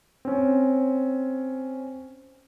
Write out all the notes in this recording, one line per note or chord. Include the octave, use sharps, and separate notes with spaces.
C4 C#4